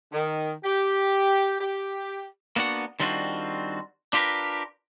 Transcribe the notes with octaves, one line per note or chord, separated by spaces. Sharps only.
D#3
G4
G4
A#3 B3 D4 F#4 F#5
D#3 G3 C4 D4 F4 F#4
D4 F4 G4 G#4 A#4 B4